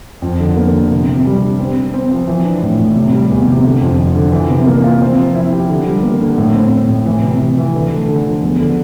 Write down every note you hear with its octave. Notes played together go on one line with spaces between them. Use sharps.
F2
D3
A#3
D3
C3
C3
G3
D4
C4
C4
C4
F3
E3
D4
A2
A2
C3
G3
E2
C3
D3
F2
D3
D3
E3
C3
A#3
F4
C4
F3
E4
G4
D3
G3
A#3
D3
A2
C4
C4
A2
E3
C3
C3
E3
D3
A3
D3
F3
E2
D3